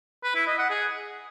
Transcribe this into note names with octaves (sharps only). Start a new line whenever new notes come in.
B4
E4
D#5
F#5
G#4